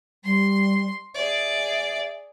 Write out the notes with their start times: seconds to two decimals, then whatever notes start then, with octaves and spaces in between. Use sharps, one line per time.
0.24 G3 C6
1.15 G#4 D5 E5